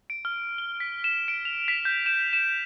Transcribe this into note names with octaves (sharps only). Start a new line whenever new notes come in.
D7
F6
G7
B6
E7
D7
F7
B6
G6
E7
E7